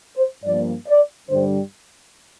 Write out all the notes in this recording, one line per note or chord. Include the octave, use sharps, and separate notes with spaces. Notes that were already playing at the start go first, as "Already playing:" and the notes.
C5
G2 F3 A#3 D5
D5
G2 D3 G3 D4 C5